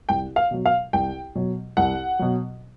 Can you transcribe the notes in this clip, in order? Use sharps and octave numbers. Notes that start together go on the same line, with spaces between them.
C2 G5
F5
B2 F#3
F5
C2 G5
B2 F#3
C2 F#5
B2 F#3